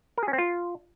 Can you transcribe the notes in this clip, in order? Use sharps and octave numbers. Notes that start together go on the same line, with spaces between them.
A#4
G#4
C#4
C4
F4